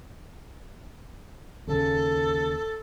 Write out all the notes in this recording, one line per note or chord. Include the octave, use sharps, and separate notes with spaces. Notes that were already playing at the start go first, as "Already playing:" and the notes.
D#2 C#3 A4